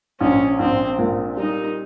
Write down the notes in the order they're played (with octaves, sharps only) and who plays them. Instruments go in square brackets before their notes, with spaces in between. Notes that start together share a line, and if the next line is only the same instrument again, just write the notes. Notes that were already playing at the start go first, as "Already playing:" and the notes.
[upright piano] A#1 [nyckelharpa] C#4
[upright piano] A#1 [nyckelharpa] C4
[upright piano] A#2
[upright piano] G3 [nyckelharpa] D#4